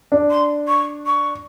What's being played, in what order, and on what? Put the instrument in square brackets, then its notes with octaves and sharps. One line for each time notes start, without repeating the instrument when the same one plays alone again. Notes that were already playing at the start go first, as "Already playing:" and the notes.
[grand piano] D4
[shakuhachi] C6
C#6
C#6